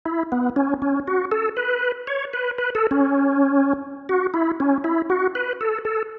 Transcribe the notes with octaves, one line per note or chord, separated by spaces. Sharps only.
E4
B3
C#4
C#4
F#4
A4
B4
C#5
B4
B4
A4
C#4
F#4
E4
C#4
E4
F#4
B4
A4
A4